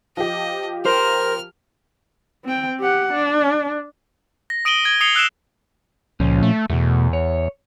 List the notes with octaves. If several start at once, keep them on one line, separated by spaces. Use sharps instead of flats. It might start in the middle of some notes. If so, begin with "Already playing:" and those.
F3 G4 D#5
A#4 C5 F6
C4 G5
G4 F#5
D4
A#6
D#6 D7 D#7 F#7 G7
G#6 G7
D#6 C7 C#7 F7 G7
E6 F#6 C7 D7 E7
C#2 A#2 F3 C#4
A3
E2 B2 A3
C#5